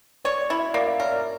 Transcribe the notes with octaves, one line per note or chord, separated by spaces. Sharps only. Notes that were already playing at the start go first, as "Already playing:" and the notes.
C#5 D5
D5
E4
E5
A#3 D5
E5
A#4 C#5
D5